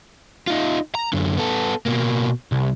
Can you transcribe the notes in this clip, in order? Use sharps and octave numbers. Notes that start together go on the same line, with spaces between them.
D#4 F4
A#5
F#2 D3
B3 A4
B2 A#3
C2